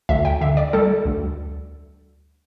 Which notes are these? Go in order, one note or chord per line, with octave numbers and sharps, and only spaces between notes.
D2 E5
G5
D3 E5
D5
G3 A4
D2